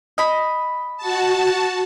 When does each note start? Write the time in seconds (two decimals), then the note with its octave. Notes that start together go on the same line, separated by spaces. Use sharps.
0.18 D#5 B5
0.97 F#4 A5